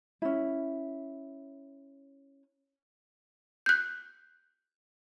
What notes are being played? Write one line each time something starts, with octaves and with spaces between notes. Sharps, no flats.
C#4 E4
F#6 G6